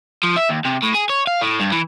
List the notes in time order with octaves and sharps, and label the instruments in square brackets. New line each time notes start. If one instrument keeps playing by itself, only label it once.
[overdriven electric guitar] F3
E5
D#2
C3
A2
G#4
C#5
F5
A2
G2
E3